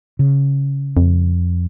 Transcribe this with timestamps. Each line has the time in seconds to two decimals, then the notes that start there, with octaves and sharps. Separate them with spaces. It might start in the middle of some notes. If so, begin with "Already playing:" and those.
0.19 C#3
0.97 F2